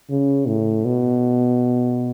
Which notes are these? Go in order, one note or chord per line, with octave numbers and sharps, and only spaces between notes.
C#3
A2
B2